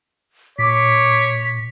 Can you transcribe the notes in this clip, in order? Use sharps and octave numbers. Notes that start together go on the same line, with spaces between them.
A#2 C#5 D6 B6